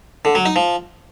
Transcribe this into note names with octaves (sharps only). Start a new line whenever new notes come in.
D3
F#3
D#4
F3